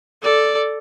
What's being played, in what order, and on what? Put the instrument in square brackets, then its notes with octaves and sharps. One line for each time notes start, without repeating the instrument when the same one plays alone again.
[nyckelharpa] A4 D5